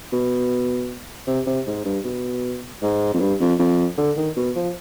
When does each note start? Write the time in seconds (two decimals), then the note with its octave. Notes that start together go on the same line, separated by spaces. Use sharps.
0.13 B2
1.27 C3
1.47 C3
1.67 G#2
1.85 G2
2.04 B2
2.83 G#2
3.14 F2
3.20 G2
3.40 F2
3.59 F2
3.98 D3
4.17 D#3
4.37 B2
4.55 F3